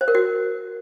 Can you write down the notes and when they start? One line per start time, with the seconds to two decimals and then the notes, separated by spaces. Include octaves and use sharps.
0.01 C5
0.08 A#4
0.15 F#4